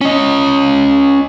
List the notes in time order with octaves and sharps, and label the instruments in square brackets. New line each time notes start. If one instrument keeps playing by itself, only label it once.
[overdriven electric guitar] C#4 D#5